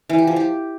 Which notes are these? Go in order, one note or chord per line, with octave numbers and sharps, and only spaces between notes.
E3
G4
F3
G4